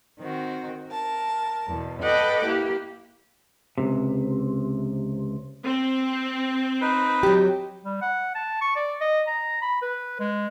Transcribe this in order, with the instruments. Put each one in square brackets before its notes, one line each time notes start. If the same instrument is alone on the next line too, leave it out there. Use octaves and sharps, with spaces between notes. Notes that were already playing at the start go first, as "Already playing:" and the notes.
[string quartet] D#3 C4 F#4
A#4 A5
E2 B2
A4 B4 D#5 F#5 G5 D6
A#3 E4 G4
[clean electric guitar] C#2 G2 C3
[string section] C4
[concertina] D#4 B4
[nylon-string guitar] F#3 G4
[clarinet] G3
F#5
A5
C#6
D5
D#5
A#5
B5
B4
G#3